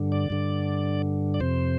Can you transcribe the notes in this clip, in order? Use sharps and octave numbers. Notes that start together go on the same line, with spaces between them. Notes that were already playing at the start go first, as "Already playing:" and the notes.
Already playing: G2 D3
D5
G2 D3
D5
F2 C3 C5